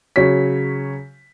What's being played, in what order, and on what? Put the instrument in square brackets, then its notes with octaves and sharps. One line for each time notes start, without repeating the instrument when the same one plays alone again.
[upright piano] C#3 F#3 C#5 B6